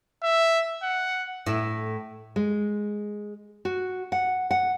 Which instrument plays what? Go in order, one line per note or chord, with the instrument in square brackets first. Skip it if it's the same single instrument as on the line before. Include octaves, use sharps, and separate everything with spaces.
[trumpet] E5
F#5
[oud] A2 E4
[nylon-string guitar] G#3
F#4
F#5
F#5